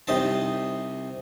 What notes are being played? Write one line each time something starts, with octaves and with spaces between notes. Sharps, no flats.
C2 C3 D#4 C5 A5